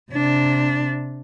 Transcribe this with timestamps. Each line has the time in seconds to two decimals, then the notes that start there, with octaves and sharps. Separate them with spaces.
0.12 C3 D4